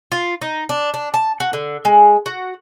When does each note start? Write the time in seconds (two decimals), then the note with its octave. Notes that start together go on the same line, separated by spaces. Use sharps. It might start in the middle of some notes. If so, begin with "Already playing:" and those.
0.12 F4
0.41 D#4
0.69 D4
0.94 D4
1.14 A5
1.40 F#4
1.53 D3
1.85 G#3
2.26 F#4